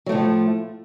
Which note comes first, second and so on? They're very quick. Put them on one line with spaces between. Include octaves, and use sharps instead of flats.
F#3 A3 A2 F3